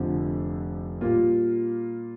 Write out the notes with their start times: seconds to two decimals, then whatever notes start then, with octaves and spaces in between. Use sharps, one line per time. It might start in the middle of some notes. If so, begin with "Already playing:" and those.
Already playing: F1 F2 D3 F3
1.01 A#2 G3 A#3 F4